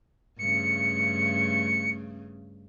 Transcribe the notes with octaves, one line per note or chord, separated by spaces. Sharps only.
G2 C#3 A3 C#7